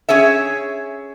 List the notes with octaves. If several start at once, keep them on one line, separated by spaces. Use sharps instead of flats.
C#4 G#4 C#5 E5